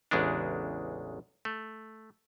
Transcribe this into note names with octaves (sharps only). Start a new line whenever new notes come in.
A1 E2 C#3 G#3 D4
A3